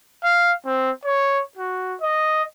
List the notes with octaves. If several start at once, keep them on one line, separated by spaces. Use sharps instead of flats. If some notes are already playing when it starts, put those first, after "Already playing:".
F5
C4
C#5
F#4
D#5